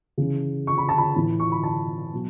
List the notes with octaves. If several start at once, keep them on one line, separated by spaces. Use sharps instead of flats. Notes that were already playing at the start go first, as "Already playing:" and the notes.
C#3 E3
C#6
B5
A5
B5
A2 E3
C#6
B5
A5
B2 F#3